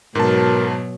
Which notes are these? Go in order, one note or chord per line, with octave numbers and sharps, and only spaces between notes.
G#2 B2 F#3 A#4 A5